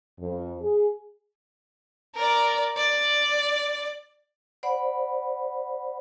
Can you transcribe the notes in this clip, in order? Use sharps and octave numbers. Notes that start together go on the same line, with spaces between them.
F2
G#4
A#4 D5
D5
C5 D5 F#5 B5